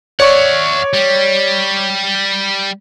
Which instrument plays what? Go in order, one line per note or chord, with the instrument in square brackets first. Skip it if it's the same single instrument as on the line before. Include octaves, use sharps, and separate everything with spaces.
[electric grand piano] C#5 D5 C#6 [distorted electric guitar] E5 F#5
[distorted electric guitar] G3